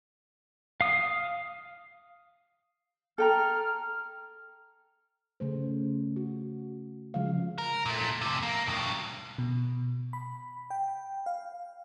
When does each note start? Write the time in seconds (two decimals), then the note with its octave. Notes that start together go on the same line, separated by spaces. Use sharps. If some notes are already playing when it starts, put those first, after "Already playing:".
0.81 F5 D#6
3.18 A4 G5 A#5 F6
5.40 C#3 A3 C5
6.16 F#4
7.14 C#3 F3 G#3 F5
7.58 A#4
7.86 A#2 A3
8.21 F2 C3
8.43 A#3
8.67 G2 B2
9.38 B2
10.13 B5
10.70 G5
11.26 F5